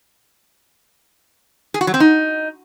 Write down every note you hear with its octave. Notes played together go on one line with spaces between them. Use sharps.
G#4
F#4
F#3
C4
D#4